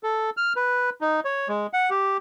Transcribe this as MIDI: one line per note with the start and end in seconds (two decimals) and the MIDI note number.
0.03 0.30 69
0.37 0.53 89
0.56 0.90 71
1.01 1.20 63
1.25 1.48 73
1.48 1.67 56
1.73 1.90 78
1.90 2.17 67